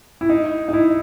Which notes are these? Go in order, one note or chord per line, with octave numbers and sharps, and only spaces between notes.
E4
D#4
D#4
E4